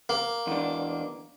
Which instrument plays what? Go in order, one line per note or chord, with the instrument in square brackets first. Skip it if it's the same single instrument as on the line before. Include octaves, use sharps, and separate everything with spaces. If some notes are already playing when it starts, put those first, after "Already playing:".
[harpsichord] A#3
[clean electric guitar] E2 D4